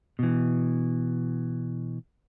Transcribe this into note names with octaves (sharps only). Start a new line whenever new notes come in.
B2 E3